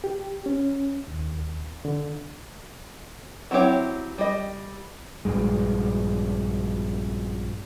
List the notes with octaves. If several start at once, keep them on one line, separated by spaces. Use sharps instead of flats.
G4
C#4
D#2
D3
F#3 C4 E4 G4 C#5
G3 D#5
A#1 G2 G#3